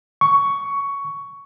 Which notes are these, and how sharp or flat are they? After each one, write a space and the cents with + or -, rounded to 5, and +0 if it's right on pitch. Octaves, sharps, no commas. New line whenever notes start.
C#6 +10